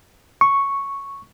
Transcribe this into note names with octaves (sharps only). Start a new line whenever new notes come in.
C#6